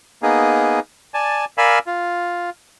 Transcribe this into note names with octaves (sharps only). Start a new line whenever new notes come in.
A#3 B3 D#4 G#4
D5 G#5 A5
A#4 D5 F5 G#5 B5 E6
F4